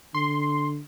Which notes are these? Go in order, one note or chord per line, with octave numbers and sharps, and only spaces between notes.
D3 C6